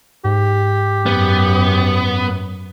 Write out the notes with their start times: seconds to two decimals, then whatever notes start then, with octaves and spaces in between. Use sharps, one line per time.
0.24 G#2 G4
1.06 F#2 B3